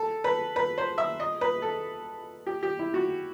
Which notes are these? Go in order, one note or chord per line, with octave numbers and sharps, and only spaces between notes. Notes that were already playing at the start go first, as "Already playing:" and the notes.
Already playing: A4
B4
B4
C5
E5
D#5
B4
A4
G4
G4
E4
F#4